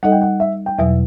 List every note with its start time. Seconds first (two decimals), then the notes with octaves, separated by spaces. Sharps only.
0.03 G3 D#4 A4 D#5 F#5
0.12 G5
0.22 F#5
0.40 E5
0.66 G5
0.78 E2 B2 F#3 E5